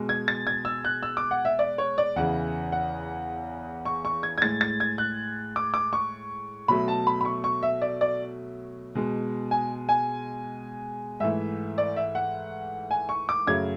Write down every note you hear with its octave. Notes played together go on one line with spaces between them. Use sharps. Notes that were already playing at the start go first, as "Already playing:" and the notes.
Already playing: B2 G#3
G#6
A6
G#6
E6
F#6
E6
D6
F#5
E5
D5
C#5
D5
E2 C#3 E3 F#5
F#5
C#6
C#6
G#6
G#6
A2 G#3 A6
A6
G#6
F#6
D6
D6
C#6
B2 F#3 A3 B5
A5
B5
B5
C#6
C#6
E5
D5
D5
B2 G#3
G#5
G#5
G#2 E3 A3 E5
D5
E5
F#5
G#5
C#6
D6
F#2 C#3 F#3 A3 G#6